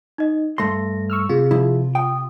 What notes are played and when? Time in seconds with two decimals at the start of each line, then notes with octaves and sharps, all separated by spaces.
0.18 D#4 D#5
0.58 G2 A3 C6 A#6
1.10 C#6 E6 F6
1.29 C3 F4 G#4
1.51 F3 E4
1.95 G5 D#6